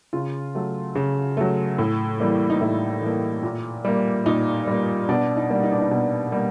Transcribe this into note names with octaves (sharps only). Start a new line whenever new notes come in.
C#3 F4
F#3 A3
C#3
F#3 A3
A2
E3 G3 A#3
D#4
A2 E4
E3 G3 A#3
A#2
G3 A#3
A#2 D#4
G3 A#3
B2 D4
D#4
G3 A#3
D#4
D4
D#4
B2
G3 A#3